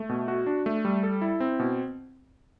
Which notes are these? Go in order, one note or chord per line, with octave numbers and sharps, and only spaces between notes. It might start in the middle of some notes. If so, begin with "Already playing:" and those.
Already playing: A3
B2
F#4
D4
A3
G3
A4
E4
C4
B2